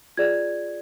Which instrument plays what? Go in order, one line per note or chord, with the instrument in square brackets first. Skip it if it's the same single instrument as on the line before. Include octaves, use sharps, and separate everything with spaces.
[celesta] F4 G#4 D5 G#6